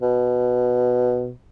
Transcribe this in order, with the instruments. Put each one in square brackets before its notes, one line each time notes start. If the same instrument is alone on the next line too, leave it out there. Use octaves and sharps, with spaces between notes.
[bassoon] B2